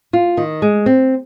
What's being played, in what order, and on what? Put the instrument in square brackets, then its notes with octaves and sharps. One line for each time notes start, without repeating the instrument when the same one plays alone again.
[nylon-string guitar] F4
D#3
G#3
C4